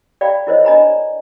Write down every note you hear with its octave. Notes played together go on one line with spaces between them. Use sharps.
D5 F5 G5 A#5 B5
E4 F4 A#4 C5 C#5 D#5
D4 D#5 G#5 A#5 B5
D5